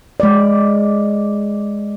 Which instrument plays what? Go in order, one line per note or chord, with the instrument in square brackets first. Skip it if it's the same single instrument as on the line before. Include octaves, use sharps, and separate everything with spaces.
[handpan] G#3 D5